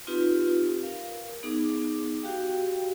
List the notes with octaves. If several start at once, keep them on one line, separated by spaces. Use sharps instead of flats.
C4 D#4 F4 G4 B4
A#4 F5
B3 D#4 G#4 D6
F#4 G4 F5 G5